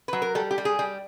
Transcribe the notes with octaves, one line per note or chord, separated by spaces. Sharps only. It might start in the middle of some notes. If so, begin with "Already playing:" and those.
F#3 B4
A#4
G3 A4
G4
G3
G#4
G3